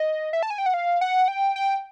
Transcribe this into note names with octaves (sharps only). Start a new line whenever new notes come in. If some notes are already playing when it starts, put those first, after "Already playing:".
Already playing: D#5
E5
A5
G#5
G5
F#5
F5
F#5
G5
G5